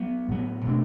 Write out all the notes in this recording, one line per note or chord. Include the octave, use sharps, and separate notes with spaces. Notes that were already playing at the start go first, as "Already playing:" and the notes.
Already playing: F#3 B3
A2 F#3 B3
B2 A3 D4